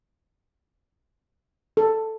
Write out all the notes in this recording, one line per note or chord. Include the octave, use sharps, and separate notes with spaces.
A4